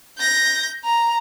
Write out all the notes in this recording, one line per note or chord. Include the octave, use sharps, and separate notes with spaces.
G6 A#6
A#5